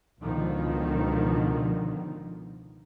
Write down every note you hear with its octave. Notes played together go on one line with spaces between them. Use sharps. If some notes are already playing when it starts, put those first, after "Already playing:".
C#2 B2 D3 D#3 F3